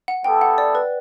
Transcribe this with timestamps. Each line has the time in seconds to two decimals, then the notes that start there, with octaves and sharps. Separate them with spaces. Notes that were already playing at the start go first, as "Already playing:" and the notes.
0.08 F#5
0.24 G3 B3 E4 A4 G5
0.41 F#5
0.58 D5
0.75 B4